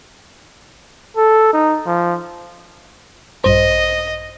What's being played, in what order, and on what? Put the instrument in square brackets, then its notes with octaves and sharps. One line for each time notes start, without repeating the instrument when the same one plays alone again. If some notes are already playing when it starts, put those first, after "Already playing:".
[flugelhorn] A4
D#4
F3
[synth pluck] A#1 G2 C5 [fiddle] D#5